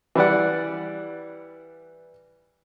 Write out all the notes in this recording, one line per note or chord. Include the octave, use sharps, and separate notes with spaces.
E3 G3 D5 F#5